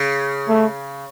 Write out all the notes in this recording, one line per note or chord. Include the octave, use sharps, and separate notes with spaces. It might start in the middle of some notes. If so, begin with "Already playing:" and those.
Already playing: C#3
A3